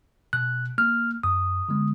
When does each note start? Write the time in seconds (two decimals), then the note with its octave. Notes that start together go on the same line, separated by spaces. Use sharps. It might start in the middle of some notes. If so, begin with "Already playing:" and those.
0.33 B2 F#6
0.78 A#3 F6
1.23 F#2 D#6
1.69 D3 G#3 B3